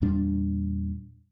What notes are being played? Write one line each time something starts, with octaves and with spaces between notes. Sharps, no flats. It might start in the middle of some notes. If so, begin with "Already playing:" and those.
E2 A#2 G3 D4